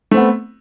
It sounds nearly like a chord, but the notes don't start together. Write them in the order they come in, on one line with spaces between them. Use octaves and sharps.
A3 C4 B3